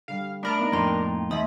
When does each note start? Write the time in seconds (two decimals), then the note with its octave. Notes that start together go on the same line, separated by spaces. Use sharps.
0.08 D3 G3 F5
0.43 A3 D4 A#4 B5 D7
0.59 A#3 B3 D#4
0.72 F2 A2 G5 A#5 C6
1.31 D#2 A3 D#5 E5 B5 C6 D#6